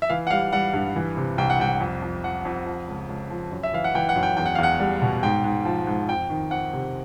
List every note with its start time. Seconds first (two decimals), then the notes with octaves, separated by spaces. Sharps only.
0.02 E5
0.10 E3 F5
0.27 F#5
0.30 G3 F5
0.52 G3 F#5
0.74 G2
0.96 E3
1.17 C3
1.38 C2 G5
1.50 F#5
1.60 C2 G5
1.80 F2
2.02 F2
2.23 F3 F#5
2.45 F2
2.66 F3
2.87 C#2
3.09 C#2
3.31 F3
3.52 F#2
3.63 E5
3.73 E3 F5
3.84 F#5
3.95 E3 G5
4.09 F#5
4.16 F#2
4.23 G5
4.37 E2 G5
4.46 F#5
4.55 E2 F5
4.63 F#5
4.80 G3
5.02 B2
5.23 G#2 G5
5.44 G#2
5.65 F3
5.87 G#2
6.09 F2 G5
6.30 D#3
6.51 F2 F#5
6.73 C3